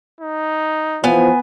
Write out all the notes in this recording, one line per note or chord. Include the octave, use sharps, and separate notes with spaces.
D#4
E3 F3 B3 G#5